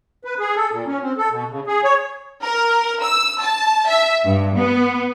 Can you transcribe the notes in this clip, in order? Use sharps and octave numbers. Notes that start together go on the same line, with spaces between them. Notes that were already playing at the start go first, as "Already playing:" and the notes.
B4
G#4
A4
A#2
C#4
C4
A4
B2
C#3
G#4
C#5
A#4
E6
A5
E5
G2
B3